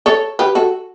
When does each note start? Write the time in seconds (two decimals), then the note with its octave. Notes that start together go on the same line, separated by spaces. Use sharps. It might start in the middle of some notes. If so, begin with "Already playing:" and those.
0.06 A4 C#5
0.39 G4 B4
0.55 F#4 A4